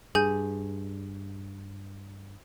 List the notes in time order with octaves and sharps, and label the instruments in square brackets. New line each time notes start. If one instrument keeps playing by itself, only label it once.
[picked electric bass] G2 [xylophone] G#4 G#5 G6